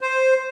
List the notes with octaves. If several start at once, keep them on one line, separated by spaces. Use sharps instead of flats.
C5